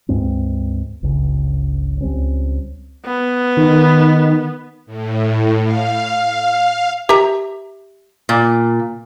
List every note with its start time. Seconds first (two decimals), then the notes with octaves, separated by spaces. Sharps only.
0.09 C#2 G2 G#3 C4
1.03 G1 C#2 G2 C#3
2.01 C#2 G3 C4 C#4
3.05 B3
3.57 D#3
4.86 A2
5.64 F5
7.09 G4 E5 A#5
8.29 A#2